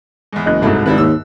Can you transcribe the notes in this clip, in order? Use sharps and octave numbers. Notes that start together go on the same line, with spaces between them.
E2 G#2
F#1 D#5 F#6
C2 G#2 F#3 A3 E4
G#1 G3 E4 B4
D#2 E6